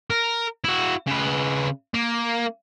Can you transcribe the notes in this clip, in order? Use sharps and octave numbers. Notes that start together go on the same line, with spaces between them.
A#4
E4 F#4
C#3 B4
A#3